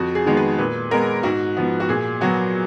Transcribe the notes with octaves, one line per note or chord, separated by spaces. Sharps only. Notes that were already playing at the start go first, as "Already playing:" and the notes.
Already playing: F2 F#4
G#4
D#3 G#3 B3
B4
A#2 B4
G#3 B3 A#4
G#2 F#4
F3 B3
F#4
A#2 G#4
F#3 B3 F#4